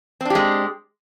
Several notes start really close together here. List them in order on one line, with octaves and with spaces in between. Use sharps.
C4 D4 G4 G#3